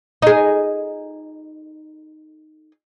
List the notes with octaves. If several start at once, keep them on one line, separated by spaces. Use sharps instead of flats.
D#4 G#4